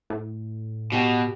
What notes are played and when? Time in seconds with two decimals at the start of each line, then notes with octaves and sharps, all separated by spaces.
0.10 A2
0.92 B2 F#4 G4